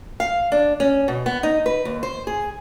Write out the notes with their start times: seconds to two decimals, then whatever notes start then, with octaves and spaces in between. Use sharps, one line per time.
0.20 F5
0.52 D4
0.80 C#4
1.08 B2
1.26 B3
1.43 D#4
1.66 B4
1.85 D#2
2.03 C5
2.27 G#4